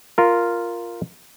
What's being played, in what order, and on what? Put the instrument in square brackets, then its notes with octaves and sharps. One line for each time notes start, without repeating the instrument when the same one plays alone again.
[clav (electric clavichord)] F4 A#4